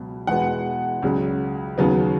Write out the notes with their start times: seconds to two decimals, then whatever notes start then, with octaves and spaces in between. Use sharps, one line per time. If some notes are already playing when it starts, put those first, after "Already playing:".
Already playing: C#2 B2 F#3
0.27 E2 B2 G#3 B3 F#5
1.02 C#2 C#3 F#3
1.78 D#2 C#3 F#3 B3